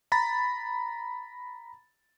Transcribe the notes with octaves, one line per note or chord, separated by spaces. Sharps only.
A#5 B5 A6